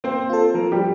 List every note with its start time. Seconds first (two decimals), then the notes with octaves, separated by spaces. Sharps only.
0.04 A#3 C4 C5
0.30 F4 A4
0.54 F3 A#3 A#4
0.72 G3 G4